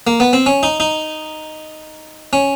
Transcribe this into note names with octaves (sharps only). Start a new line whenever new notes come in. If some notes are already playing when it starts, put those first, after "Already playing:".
A#3
B3
C4
C#4
D#4
D#4
C#4